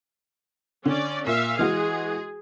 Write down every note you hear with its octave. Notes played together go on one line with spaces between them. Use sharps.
D3 C#4 D5
A#2 E5 F5
E3 G#3 F#4 G#4